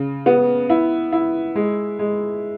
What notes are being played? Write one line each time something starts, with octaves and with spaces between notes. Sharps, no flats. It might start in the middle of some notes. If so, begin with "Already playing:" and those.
Already playing: C#3
B3
E4
E4
G#3
G#3